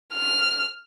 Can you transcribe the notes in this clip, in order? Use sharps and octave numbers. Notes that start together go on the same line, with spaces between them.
F6